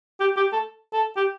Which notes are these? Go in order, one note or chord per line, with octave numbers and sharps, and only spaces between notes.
G4
G4
A4
A4
G4